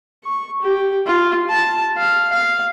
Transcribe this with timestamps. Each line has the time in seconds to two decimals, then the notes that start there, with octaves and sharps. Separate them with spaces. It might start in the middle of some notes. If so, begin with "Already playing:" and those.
0.24 C#6
0.62 G4
1.07 F4
1.50 A5
1.97 F5
2.32 F5